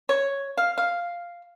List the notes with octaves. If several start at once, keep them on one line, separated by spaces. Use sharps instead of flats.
C#5
F5
F5